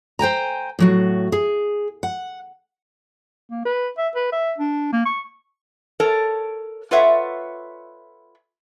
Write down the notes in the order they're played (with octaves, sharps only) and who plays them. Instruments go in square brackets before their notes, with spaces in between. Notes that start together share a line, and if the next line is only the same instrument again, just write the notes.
[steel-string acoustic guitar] C5 G5 G#5 A#5
A2 F#3 F#4
G#4
F#5
[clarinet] A#3
B4
E5
B4
E5
D4
A#3
C#6
[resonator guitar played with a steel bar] A4 A#4 C#5 A5
F4 A4 B4 C#5 E5 F#5